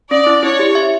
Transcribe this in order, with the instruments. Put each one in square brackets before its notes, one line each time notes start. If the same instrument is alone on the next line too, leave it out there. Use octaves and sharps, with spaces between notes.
[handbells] C#4 [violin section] D5
[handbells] E4
[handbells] E4 [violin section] C#5
[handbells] G4
E5